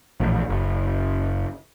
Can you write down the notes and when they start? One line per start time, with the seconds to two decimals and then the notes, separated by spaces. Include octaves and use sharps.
0.20 A#1 E2 A2
0.49 F#1